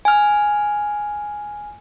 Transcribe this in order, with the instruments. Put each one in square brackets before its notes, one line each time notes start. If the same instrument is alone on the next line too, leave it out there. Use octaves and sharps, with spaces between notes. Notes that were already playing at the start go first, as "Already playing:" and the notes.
[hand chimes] G#5 F6